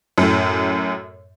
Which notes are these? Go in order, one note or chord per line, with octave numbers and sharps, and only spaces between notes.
F#2 A2